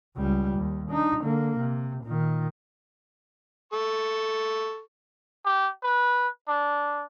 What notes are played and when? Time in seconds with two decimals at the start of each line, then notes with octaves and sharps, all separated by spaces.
0.17 C#2 G3
0.55 D#2
0.90 D4 D#4
1.22 D3 A#3
1.59 C3
2.04 A#2 D#3
3.73 A4 C#6
5.45 G4
5.83 B4
6.47 D4